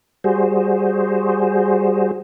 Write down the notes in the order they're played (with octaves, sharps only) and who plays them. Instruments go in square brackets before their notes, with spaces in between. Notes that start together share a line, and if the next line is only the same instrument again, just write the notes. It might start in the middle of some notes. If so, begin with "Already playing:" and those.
[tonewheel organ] G3 F#4 G#4 C5